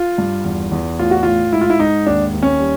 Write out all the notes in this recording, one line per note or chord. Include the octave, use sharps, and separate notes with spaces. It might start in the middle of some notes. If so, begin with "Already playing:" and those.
Already playing: F4
G2
E2
E2
A2 F4
F#4
A2 F4
G#2 E4
F4
E4
G#2 D#4
D#2 D4
D#2
C#4
G3